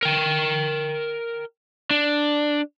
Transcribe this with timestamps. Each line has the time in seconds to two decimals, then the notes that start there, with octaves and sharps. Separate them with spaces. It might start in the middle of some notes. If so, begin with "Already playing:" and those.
0.03 A#4 G5
1.91 D4